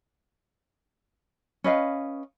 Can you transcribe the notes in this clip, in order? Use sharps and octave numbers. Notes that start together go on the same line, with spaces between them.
C#4 B4 D#5 F5